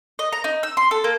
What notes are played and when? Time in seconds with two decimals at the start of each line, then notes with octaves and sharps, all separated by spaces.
0.19 D#5
0.33 A#5
0.44 D#4
0.63 E6
0.77 C6
0.91 A4
1.04 A#3